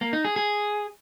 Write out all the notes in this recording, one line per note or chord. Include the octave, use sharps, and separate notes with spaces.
A#3
D#4
G#4
G#4